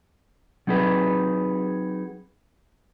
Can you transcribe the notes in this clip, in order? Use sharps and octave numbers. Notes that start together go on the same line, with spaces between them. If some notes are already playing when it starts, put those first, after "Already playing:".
F#3 C4 D#4 G#4 B4